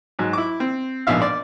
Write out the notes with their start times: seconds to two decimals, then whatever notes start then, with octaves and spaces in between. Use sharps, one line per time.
0.19 G#2 F#3
0.33 E4 D6
0.60 C4
1.07 A#1 G#2 B2 E5 F5
1.22 D5